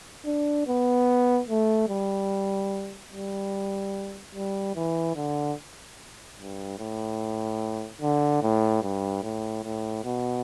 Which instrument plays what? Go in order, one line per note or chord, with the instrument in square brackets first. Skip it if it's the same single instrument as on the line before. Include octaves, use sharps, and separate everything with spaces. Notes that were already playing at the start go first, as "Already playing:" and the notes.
[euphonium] D4
B3
A3
G3
G3
G3
E3
D3
G2
A2
D3
A2
G2
A2
A2
B2